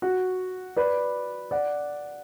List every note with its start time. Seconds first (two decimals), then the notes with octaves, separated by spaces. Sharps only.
0.02 F#4
0.76 B4 D5
1.51 D5 F#5